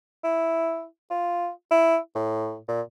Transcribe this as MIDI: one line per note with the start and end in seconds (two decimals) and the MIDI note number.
0.24 0.85 64
1.10 1.49 65
1.71 1.98 64
2.15 2.57 45
2.68 2.81 46